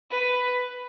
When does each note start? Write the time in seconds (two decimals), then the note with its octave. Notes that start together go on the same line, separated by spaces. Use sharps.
0.10 B4